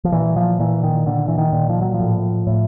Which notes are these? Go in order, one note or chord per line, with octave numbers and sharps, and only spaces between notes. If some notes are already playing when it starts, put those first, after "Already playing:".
F3
A#2 E3
F3
A#2 E3
D#3
A#2 D3
E3
D#3
A#2
F3
F#3
F3
A2
A2